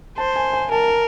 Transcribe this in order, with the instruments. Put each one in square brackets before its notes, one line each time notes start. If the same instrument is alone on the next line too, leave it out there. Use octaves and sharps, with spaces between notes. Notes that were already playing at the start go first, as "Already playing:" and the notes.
[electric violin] C5 [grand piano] A5
[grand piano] G#5
G#5
[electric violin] A#4 [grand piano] A5